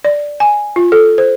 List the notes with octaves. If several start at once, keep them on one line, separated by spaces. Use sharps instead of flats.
D5
G#5
F4
A4
C5